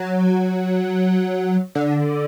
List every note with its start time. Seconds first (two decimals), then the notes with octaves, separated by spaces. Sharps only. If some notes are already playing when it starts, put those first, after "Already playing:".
Already playing: F#3
1.75 D3